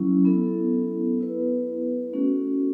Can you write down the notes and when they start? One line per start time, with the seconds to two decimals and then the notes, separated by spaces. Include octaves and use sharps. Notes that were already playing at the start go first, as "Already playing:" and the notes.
Already playing: F#3 C#4 E4
0.25 B3 E4 A4
1.20 B3 E4 B4
2.13 A3 C#4 F#4 A4